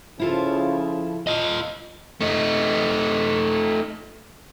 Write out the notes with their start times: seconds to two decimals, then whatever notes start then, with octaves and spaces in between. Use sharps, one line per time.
0.20 C#3 F3 E4 F4 A4
1.27 F4 D#5
2.21 A3 D#4